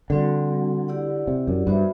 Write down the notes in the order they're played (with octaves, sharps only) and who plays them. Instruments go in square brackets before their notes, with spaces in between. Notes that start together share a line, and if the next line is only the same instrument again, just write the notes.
[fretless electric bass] D3 [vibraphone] G3 C4 F#4
[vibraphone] E4 G4 D5 F#5
[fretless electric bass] C3
F#2
[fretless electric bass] G2 [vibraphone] B3 F#4 C5 E5